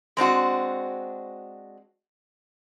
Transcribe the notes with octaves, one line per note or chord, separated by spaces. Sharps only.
G#3 C4 D4 F#4